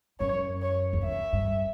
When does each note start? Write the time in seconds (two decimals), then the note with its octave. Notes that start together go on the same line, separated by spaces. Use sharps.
0.20 F#2 C#5
0.62 C#5
0.93 E2
1.04 F#2 E5
1.33 G2